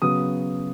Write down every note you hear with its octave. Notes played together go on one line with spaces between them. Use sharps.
C#3 F#3 B3 D#6